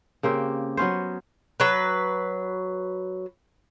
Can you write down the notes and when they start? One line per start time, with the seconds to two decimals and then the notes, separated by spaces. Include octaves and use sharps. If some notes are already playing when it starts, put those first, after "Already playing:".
0.23 C#3 A#3 C4 G4
0.77 F#3 B3 C#4 C5
1.60 F#3 B4